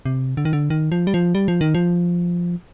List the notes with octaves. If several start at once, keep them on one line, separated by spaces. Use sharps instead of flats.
C3
D3
D#3
D3
D#3
F3
G3
F3
G3
F3
D#3
F3